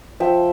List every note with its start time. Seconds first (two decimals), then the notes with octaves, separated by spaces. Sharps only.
0.20 F3 E5 G5